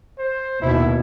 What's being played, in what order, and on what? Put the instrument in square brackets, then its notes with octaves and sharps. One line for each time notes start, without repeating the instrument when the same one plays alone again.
[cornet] C5
[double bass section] D#2 B2 [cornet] E4